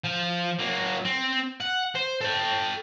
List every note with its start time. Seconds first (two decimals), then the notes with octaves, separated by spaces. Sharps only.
0.04 F3
0.59 F#3 A#3
1.05 C4
1.60 F#5
1.95 C5
2.21 A4 G5